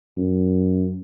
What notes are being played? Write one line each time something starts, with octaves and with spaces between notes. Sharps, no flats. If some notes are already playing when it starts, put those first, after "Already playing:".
F#2